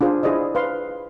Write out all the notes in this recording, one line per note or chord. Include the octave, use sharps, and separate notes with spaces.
D4 F4 G#4 C5
E4 G#4 C5 D5 D#5
B4 C5 F5 C6